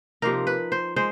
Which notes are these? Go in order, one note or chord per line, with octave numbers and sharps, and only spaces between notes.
C3 F3 A#3 D#4 A#4
B4
C5
G#3 C5